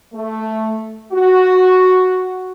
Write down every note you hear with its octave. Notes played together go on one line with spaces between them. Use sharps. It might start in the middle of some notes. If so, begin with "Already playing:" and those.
A3
F#4